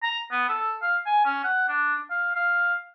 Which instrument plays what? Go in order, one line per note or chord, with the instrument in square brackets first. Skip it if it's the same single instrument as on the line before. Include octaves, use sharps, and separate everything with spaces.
[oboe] A#5
B3
A4
F5
G#5
C#4
F#5
D4
F5
F5